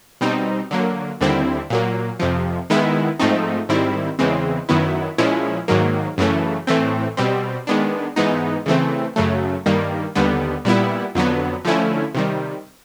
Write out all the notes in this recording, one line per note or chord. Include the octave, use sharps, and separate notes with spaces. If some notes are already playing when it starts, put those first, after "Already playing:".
B2 G3 C4 D#4
D3 F#3 A#3
D#2 D3 G3 C4 E4
A#2 F#3 A#3
F2 C3 F3
D#3 G#3 B3 E4
G#2 F3 A3 C4 D#4
G#2 D#3 G3 C4 E4
E2 C#3 E3 G#3 C4
F#2 D#3 F#3 B3 E4
A#2 F3 G#3 C#4 E4
G#2 D#3 F#3 A#3
F#2 C#3 E3 A3
A2 E3 A3 C4
B2 G3 C4
D#3 G#3 B3 D4
G#2 E3 G#3 B3 D#4
C#3 E3 A3 C4
F#2 C#3 F#3 A3
G2 D#3 G3 A#3
D#2 D3 G3 B3
A#2 G3 B3 E4
F2 D3 F#3 B3
D3 F3 A3 C#4 E4
C3 D#3 G3